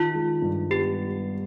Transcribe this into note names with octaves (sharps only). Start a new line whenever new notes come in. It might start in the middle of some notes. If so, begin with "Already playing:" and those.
Already playing: D#3 F4
G#3
G2
B3 G4